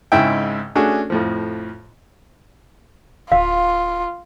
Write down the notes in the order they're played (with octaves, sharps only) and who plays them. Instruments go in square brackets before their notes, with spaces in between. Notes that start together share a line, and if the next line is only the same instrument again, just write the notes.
[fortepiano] G#1 G#2 C#3 E4 E5 G5
A3 C#4 D4 F#4 G#4
F2 A2 F3
[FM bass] D1 [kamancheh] F4 [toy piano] F5